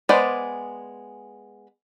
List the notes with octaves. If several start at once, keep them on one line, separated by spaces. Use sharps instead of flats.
G#3 B3 C5 D5